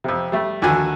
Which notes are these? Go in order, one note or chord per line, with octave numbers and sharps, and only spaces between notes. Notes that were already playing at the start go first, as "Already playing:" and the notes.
F2 C3
G3 A3
D#2 D3 F#4 G#5